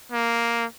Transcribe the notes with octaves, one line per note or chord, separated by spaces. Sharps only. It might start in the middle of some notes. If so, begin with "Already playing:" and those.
A#3